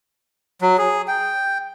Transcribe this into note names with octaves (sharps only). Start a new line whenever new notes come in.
F#3
G#4
G5